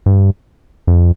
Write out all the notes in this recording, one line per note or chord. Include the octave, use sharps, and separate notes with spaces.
G2
F2